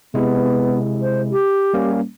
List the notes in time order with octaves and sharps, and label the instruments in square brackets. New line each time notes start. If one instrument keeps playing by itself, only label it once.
[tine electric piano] C3 G#3 E4 [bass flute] B3
[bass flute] C5
G4
[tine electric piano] G3 A#3 C#4